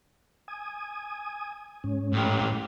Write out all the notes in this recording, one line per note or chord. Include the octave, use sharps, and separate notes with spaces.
G#5 D#6
G#2 C#4
A2 G4